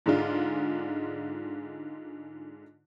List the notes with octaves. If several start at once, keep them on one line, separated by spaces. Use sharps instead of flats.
G#2 D3 G#3 D4 F4